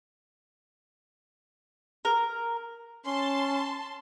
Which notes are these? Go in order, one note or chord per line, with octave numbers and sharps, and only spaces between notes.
A#4
C#4 A5 C6